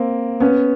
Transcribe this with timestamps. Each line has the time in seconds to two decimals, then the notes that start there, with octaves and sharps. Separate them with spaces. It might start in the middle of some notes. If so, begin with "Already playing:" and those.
Already playing: A#3 C4
0.40 B3 C#4